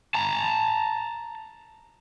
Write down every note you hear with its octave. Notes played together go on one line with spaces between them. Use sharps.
A5 A#5